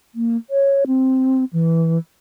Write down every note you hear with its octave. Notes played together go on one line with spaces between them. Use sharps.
A#3
C#5
C4
E3